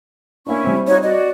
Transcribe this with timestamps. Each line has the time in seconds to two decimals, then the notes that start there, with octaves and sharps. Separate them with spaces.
0.47 A#3 C#4 D4 E4 C#6
0.64 G3 C4
0.87 D#4 F4 F#4 C#5
1.03 F#4 D5 D#5